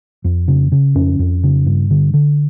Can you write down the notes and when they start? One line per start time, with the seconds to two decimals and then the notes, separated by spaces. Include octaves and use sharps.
0.24 F2
0.48 C#3
0.72 C#3
0.95 F2 C#4
1.19 F2
1.43 C#3
1.66 G2
1.91 D3
2.14 D3